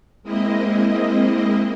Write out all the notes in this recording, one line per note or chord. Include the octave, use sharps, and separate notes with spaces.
G#3 A#3 C4 E4 D#5